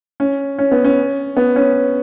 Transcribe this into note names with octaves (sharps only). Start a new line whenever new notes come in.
C#4
C#4
B3
C#4
B3
C#4